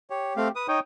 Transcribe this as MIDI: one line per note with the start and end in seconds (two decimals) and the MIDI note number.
0.10 0.52 67
0.10 0.33 73
0.37 0.48 57
0.37 0.48 60
0.37 0.48 77
0.55 0.67 71
0.55 0.67 87
0.68 0.79 63
0.68 0.80 73
0.68 0.80 79
0.68 0.80 87